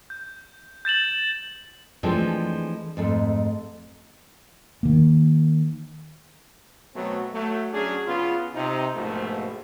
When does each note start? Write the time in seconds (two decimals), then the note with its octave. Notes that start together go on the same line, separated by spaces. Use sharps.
0.10 G6
0.85 G6 A6 E7 F#7
2.03 E3 F3 G#3 A3 C4 D4
2.97 F2 G#2 A3
4.83 D#3 A#3
6.95 B2 F#3 A3 B3 C4
7.33 F#3 A3
7.73 F#3 C#4 D4 G#4
8.07 C#3 B3 F4
8.55 C3 D#4
8.95 A#1 G#2 B2 F3 A3